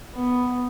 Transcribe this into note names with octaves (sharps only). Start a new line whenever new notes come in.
B3